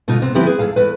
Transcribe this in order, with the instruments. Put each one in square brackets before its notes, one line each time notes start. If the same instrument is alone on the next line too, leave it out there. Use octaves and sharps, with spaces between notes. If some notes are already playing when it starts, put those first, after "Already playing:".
[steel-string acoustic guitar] B2 D3 D#4 F4
C3 B3 C4
D3 F3 B3 C4 E4 G4
G#4 B4
E2 A4 F5
E2 B4